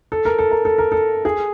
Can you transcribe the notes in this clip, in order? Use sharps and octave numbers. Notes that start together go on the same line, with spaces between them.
A4
A#4
A4
A#4
A4
A#4
A4
G#4